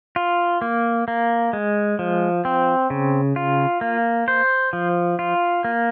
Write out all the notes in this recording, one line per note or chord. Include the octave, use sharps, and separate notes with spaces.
F4
A#3
A#3
G#3
F3
C4
C#3
F4
A#3
C5
F3
F4
A#3